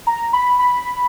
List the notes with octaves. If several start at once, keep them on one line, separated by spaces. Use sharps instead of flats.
A#5
B5
B5